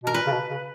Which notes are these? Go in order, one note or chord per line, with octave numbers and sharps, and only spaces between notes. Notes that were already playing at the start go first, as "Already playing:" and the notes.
B2 A#4
A#2 B4
C#3
B2
C#3